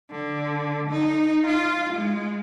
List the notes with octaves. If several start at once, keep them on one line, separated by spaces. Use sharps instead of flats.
D3
D#4
F4
G#3